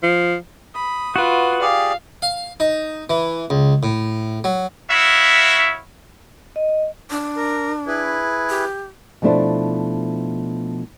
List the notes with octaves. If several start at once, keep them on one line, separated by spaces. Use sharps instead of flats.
F3
B5 D#6
F4 F#4 B4
G4 G#4 D5 F5
F5
D#4
E3
C#2
A2
F#3
E4 F#4 C#5 E5 F5
D#5
D4
A#4
E4 G#4 B4
G4
B2 F3 A3 D4 E4 C5